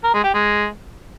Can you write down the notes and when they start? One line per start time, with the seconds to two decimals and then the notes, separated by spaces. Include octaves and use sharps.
0.04 A#4
0.14 G#3
0.24 G4
0.34 G#3